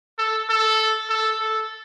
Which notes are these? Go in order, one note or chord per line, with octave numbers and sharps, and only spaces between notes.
A4
A4
A4
A4